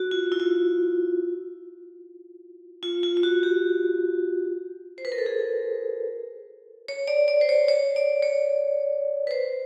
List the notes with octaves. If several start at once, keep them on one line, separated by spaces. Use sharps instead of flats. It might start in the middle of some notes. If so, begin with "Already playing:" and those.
Already playing: F#4
F4
E4
F4
F4
F4
F4
F#4
G4
C5
B4
A#4
A4
G#4
C#5
D5
D5
C5
C#5
C#5
D5
C#5
B4
C5